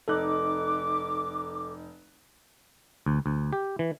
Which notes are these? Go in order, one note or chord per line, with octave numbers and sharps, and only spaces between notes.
F1 D#4 A4 D6 F#6
D2
D2
G4
E3